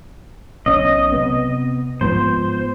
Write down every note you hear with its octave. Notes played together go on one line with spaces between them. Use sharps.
B1 C#4 D#5
C3 B3
G#2 F3 B3 C5